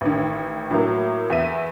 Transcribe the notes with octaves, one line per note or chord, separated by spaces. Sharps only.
A1 D#3
A2 F#3 A#3
E2 E5 D#7